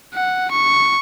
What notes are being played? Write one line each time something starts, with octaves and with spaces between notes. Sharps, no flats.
F#5
C#6